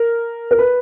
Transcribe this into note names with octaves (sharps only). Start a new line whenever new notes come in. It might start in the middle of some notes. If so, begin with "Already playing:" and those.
Already playing: A#4
A#4
B4